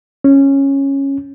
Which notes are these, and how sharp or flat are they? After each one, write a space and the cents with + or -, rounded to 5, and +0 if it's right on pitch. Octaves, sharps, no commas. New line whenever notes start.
C#4 -10